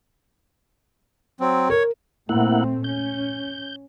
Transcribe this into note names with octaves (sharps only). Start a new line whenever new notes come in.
F#3 C4
A#4 C#5
A#2 A3 A#3 C4 E4 F#5
C#4 G6